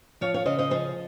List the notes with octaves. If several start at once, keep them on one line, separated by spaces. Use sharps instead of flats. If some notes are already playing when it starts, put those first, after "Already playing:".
F3 C#5 F5
C#5 F5
C#3 C5 D#5
C5 D#5
F3 G#4 C5